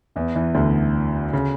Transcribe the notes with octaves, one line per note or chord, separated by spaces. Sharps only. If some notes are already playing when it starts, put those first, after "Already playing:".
E2 E3
E2 E3
D2 D3
C#3